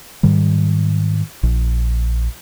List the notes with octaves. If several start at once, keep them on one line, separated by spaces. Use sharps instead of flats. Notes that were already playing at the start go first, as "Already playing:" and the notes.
G#2 D#3 G3
A#1